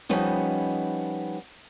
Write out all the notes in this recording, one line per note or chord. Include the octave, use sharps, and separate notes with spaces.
F3 G3 B3 C#4 D#4